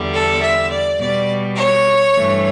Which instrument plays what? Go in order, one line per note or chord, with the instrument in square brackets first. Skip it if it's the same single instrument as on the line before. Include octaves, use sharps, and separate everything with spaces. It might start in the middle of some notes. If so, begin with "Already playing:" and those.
Already playing: [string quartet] E2 D3 G3
A4
E5
D5
B2 G3 D5
C#5
G2 E3 A3